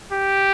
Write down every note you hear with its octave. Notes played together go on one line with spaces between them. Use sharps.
G4